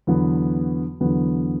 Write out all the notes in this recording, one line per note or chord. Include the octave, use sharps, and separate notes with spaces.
E2 D3 F#3 B3
E2 D3 F#3 B3